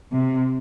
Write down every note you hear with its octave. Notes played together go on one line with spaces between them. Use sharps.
C3